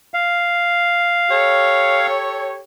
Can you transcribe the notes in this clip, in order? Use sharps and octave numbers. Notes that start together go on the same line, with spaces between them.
F5
G4 A4 C#5